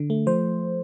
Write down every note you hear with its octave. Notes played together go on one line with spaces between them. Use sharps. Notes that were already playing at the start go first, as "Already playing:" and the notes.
Already playing: D3
A3
F3 C5